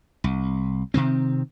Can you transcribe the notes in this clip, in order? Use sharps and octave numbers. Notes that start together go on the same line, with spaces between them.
C2
C3 D#3 C4